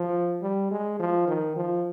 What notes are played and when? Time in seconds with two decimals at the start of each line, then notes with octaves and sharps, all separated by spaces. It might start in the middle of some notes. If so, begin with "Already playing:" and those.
Already playing: F3
0.42 G3
0.71 G#3
1.00 F3
1.28 D#3
1.56 F3